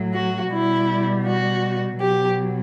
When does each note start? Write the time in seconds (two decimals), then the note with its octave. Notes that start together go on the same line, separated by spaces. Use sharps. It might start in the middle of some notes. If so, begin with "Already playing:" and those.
Already playing: A2 F#3
0.13 F#4
0.51 B2 G3 E4
1.25 F#4
1.99 B2 F#3 G4